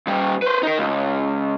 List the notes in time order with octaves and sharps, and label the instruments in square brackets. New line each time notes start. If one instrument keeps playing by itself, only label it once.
[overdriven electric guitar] A#2 G3
B4 C5
D#4 A#4
C#2